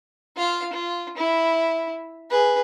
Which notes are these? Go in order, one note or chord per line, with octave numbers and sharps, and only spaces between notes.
F4 F5
F4
E4
G#4 B4